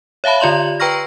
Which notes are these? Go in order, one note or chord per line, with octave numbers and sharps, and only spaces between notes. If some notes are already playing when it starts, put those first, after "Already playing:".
C#5 E5 F5 A5 B5
D3 F4 D5 C6 F#7
B4 G5 A#5 C#6 F6 A#6